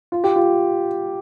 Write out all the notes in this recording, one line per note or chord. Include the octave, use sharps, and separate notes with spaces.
F4
G4
F4